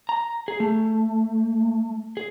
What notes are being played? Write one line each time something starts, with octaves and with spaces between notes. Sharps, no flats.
A#5
G#4
A3
G#4